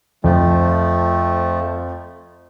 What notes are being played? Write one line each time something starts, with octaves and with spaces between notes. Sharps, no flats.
F2 F3 A3